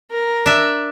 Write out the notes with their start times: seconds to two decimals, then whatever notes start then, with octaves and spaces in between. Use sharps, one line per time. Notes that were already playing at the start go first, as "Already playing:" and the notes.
0.11 A#4
0.46 D4 E5